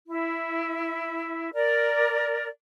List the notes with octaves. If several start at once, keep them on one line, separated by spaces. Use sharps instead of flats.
E4
A#4 D5